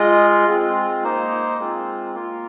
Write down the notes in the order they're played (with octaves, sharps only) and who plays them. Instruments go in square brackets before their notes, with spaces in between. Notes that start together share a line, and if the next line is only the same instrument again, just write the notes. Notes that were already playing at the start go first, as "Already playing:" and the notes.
Already playing: [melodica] G#3 F4 D#5
G#3 C4 F4
A#3 D#4 C5
G#3 C4 F4
A#3 F4